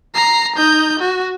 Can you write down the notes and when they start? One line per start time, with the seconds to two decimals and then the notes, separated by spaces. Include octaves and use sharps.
0.14 A#5 C7
0.56 D#4 G6
0.99 F#4